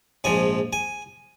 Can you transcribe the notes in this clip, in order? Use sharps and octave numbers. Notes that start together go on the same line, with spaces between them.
A#1 G#2 F3 G#5
G#5